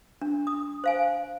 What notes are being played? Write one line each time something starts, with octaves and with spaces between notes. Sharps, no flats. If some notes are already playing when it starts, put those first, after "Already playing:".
D4
D#6
C5 F5 G#5